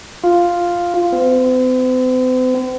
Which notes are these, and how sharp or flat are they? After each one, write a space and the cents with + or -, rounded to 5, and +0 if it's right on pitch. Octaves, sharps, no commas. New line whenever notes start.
F4 +0
C4 -45